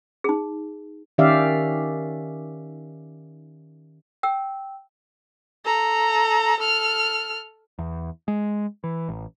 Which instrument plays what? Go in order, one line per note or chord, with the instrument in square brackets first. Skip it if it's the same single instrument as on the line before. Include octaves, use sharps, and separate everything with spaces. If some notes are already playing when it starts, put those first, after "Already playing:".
[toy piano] D#4 G#4
[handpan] D#3 C#4 G4 D5 E5 F5
[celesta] G5 E6
[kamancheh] A4 A#5
A4 F6
[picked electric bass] E2
G#3
E3
A1